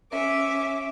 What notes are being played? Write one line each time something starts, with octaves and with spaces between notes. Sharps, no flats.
C#4 E5 D6